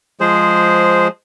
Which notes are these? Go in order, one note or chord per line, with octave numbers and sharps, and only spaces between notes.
F3 G#3 G#4 C5